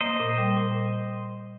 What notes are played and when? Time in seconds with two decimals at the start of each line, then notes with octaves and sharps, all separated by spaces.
0.01 A#3 C5 D#5
0.20 A#2
0.38 G3
0.57 A#2